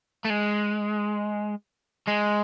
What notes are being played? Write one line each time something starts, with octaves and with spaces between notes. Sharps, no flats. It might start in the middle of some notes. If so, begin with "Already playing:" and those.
A3
G#3
G#3